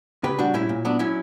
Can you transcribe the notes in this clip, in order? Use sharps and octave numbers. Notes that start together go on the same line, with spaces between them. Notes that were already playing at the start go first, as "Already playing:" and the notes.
C#3 G4 B4
G3 D4 F#4
A#2 C#4 E4
A#2
F#3 B3 D4
F#3 C#4 E4